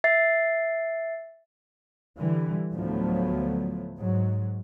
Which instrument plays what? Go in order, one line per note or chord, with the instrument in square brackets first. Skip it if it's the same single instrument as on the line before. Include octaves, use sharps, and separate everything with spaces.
[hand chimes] E5 A6 C7
[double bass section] D3 E3 G3
D2 A2 F3 F#3 A3 B3
G#2 F#3